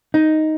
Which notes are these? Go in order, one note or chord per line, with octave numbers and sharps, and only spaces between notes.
D#4